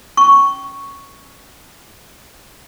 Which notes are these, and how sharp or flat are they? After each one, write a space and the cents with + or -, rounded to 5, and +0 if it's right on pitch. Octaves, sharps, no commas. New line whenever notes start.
C#4 +0 C#6 +0